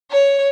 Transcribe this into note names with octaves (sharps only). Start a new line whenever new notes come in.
C#5